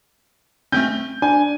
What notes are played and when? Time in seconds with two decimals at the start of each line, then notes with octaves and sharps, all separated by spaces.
0.72 A3 C4 C#4 G6
1.22 D4 G#5